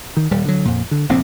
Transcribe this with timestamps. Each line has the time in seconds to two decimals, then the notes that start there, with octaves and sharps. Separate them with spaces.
0.17 D#3
0.31 D#1 G3
0.45 D3 F#3
0.65 F2 A#2
0.91 D3
1.09 F1 A#1 A2 C4